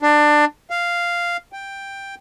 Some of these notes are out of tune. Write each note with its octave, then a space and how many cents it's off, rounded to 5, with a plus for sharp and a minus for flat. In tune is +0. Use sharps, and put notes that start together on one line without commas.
D4 +20
F5 -5
G5 +5